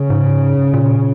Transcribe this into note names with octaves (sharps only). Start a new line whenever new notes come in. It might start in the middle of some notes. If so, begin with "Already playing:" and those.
Already playing: C#3
G#2
A#2